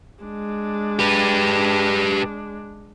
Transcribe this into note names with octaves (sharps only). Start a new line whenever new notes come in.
G#3 D4
G4 B4